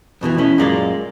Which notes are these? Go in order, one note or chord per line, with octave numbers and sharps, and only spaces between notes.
F2 B2 D3 E3
A3 C#4 E4 D#5
F#2 A#2 G#3 A#3 G#4 D5